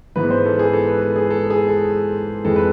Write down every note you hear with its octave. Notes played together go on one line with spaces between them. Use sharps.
G#2 E3 G#3 B3 B4
C5
A4
G#4
A4
B4
A4
G#4
A4
G#4
A4
F2 E3 G#3 A4
B4